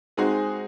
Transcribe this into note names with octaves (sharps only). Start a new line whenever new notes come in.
G#3 C4 D#4 F#4 G#4